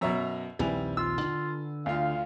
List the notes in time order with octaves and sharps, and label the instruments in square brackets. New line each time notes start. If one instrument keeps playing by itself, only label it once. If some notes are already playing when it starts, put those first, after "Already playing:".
[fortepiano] F#2 B2 [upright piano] C#5 E5 A#5
[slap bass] A#1 D#2 C4 [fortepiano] G3 E4 [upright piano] B4 G#5 F7
[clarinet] F4 [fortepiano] E6
[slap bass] D3
[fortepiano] D2 F4 [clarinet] F5